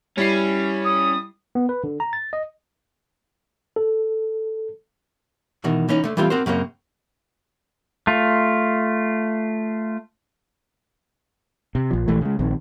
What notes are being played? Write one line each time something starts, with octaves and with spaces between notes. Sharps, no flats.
G3 C#4 E4 C7
D#6
B3
B4
D3
A#5
A6
D#5
A4
B2 D#3 E3
E3 C#4 D#4
D3 A3
E3 G3 B3 C4 F4 A4
C4 F#4 A#4 C5
F#2 C#3 A#3 C4
A3 F4
C3
A#1 F3
A#1 E3 A3
C#3 G#3
A#1 D#3 C4